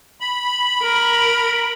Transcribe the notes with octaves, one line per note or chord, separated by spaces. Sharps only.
B5
A#4